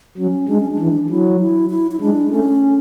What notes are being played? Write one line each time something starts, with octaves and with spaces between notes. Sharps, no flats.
F#3 C#4
G#3 D4
C#4
D4
E3
F#3 E4
E4
E4
E4
G#3 D4
A3 C#4